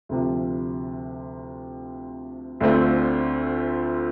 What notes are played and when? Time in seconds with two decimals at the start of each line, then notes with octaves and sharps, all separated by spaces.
0.09 D2 C3 F3
2.60 D2 D3 A3 C4 F4